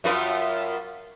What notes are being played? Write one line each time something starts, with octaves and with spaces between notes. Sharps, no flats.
F#2 F4 B4